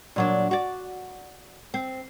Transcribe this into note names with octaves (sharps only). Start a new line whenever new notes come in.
A#2 F#3 D4
F#4 D5
C4